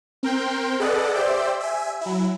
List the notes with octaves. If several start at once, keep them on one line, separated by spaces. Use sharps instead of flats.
C4 A#4 G5 C6
G#4 A4 B4 D5 D#5 F#5
G4 C5 D5 E5 G5
E5 G#5
F#3 E4